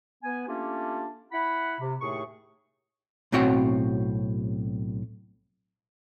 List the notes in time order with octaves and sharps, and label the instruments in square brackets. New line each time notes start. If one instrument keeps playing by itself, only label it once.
[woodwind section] B3 G#5
A3 A#3 C#4 D4 F4 G4
E4 F#5 B5
C3
D#2 A2 A3 G#4 C#6
[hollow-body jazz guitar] B1 A2 C4 F#4 C#5 F#5